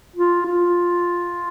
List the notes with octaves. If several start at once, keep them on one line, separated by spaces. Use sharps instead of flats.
F4
F4